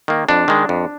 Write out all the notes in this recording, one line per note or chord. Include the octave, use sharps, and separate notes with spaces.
D#3 A#3
F2 D4
D#3 G#3
F2